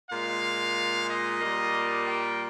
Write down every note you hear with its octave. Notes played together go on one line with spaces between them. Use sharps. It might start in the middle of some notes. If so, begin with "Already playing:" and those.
A#2 G#3 F5
D#5
A#2 G3 A#3
G5